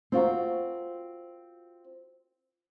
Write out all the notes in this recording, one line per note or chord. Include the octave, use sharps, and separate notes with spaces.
C4 F4 F#4 A#4